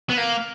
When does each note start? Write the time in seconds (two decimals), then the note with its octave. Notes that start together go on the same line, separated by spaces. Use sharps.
0.10 B3
0.17 A#3